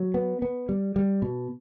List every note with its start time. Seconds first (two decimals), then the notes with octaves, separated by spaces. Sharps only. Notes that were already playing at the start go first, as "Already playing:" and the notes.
Already playing: F#3
0.14 B3
0.42 B3
0.69 G3
0.96 G3
1.22 B2